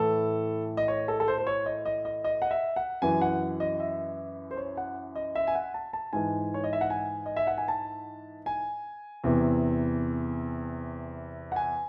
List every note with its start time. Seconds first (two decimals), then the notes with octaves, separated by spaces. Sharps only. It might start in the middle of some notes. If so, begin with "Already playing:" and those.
Already playing: A2 E3 A4
0.77 D#5
0.88 C#5
1.08 A4
1.20 A4
1.28 C5
1.38 C5
1.47 C#5
1.66 D#5
1.85 D#5
2.05 D#5
2.24 D#5
2.42 F#5
2.51 E5
2.76 F#5
3.02 F#2 E3 G#5
3.22 F#5
3.60 D#5
3.80 E5
4.51 C5
4.57 C#5
4.77 F#5
5.16 D#5
5.35 E5
5.47 G#5
5.55 F#5
5.74 A5
5.93 A5
6.13 G#2 E3 G#5
6.54 C#5
6.64 D#5
6.73 E5
6.81 F#5
6.90 G#5
7.26 D#5
7.36 E5
7.47 F#5
7.58 G#5
7.68 A5
8.46 G#5
9.24 E2 C3 E3
11.52 F#5
11.56 G#5